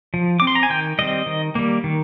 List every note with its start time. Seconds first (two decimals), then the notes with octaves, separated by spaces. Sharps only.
0.14 F3
0.40 C4 D6
0.47 C6
0.55 A#5
0.63 G#5
0.70 D#3 G5
0.99 G3 C4 D#5
1.26 D#3
1.55 G3 A#3
1.84 D#3